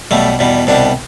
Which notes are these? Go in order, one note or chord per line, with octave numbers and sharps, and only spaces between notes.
B1 B2 G3 A3
E2 B2 G3
C2 B2 G3 D4